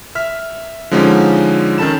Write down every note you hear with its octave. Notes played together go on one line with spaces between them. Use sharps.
E5 F6 B6
D3 F3 G#3 C#4 D#4 G4
D#3 C#4 A4 A5 B5 E7